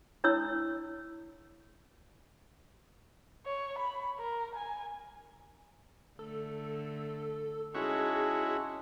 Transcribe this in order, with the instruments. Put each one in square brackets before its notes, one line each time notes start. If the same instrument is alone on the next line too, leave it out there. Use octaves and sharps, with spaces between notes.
[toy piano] D4 E4 C#5 E6
[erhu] C#5
B5
A#4
G#5
[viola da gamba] D3 A3 [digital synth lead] A4
[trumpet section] G#3 A5 [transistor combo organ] C#4 E4 F#4 [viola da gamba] D#4 [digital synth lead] G#4